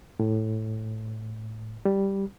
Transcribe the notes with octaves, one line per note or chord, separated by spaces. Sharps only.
A2
G3